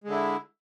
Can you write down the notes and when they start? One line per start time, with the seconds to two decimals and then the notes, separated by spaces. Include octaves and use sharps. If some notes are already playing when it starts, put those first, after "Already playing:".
0.04 G#3
0.08 D3
0.11 E4